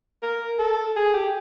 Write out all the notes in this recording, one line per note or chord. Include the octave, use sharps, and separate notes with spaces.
A#4
A4
G#4
G4